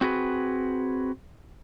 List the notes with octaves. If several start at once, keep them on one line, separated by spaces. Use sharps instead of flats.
C4 F#4 G#4 B4